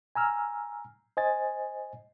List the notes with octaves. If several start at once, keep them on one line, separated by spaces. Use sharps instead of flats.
G#5 A#5 E6 F6
C5 D#5 G#5 A6